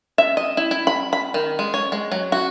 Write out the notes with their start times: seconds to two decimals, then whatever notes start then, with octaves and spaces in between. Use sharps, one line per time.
0.18 E5
0.37 D#5
0.57 E4
0.71 E4
0.87 B5
1.13 B5
1.34 D#3
1.59 G#3
1.74 C#5
1.92 G#3
2.12 F#3
2.32 F#4